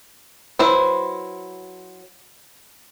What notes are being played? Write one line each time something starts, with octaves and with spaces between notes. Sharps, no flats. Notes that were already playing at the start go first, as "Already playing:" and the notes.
F#3 E4 B4 C5